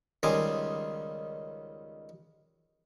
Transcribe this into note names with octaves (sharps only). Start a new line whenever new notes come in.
C#2 D#3 G3 G#5 C6 D6